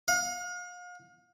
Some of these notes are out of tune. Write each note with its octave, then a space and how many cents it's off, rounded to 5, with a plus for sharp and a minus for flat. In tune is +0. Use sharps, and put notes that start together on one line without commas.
F5 +40